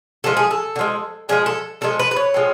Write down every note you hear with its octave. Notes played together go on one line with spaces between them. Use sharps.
D3 F3 G#3 A4
G#4
A4
D3
F3 G#3
D3 F3 G#3 G#4
A4
D3 F3 G#3 A4
B4
B4
C#5
A2 F3 G#3